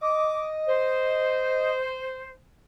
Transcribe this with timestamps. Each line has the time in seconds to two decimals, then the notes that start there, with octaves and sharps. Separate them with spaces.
0.01 D#5 D6
0.67 C5